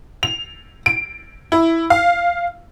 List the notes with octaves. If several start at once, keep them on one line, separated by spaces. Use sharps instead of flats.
F7
D7
E4
F5